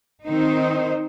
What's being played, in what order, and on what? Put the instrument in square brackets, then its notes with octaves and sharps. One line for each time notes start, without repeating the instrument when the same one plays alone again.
[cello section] D#3 C4 D#4 C5